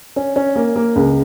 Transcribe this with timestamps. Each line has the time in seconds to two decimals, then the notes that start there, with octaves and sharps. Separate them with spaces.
0.16 C#4
0.36 C#4
0.56 A#3
0.76 A#3
0.96 C#2